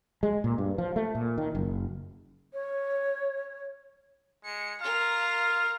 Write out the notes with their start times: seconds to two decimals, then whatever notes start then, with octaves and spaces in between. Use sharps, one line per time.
0.23 G#3
0.44 A#2
0.58 G2
0.78 F3
0.96 A3
1.15 A#2
1.38 D#3
1.55 F#1
2.53 C#5
4.45 G#3 C#7
4.82 F4 A#4 F5 A#5